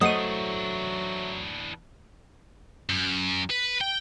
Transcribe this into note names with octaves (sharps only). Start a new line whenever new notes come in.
E3 F#3 A3 D4 C5 D#5 F#5 D#6
F#2
B4
G5